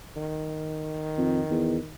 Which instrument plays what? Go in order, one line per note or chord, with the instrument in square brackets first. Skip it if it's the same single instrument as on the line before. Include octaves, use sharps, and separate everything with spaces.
[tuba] D#3
[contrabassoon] F2
E2